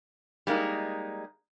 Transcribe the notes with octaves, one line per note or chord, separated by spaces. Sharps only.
G3 G#3 A#3 D#4